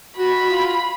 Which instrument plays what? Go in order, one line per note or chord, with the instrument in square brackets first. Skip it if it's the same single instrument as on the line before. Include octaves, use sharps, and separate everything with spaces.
[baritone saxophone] F#4 [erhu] B5
[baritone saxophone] F4